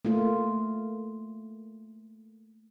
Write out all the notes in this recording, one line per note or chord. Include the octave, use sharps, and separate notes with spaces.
A3 A#3 F4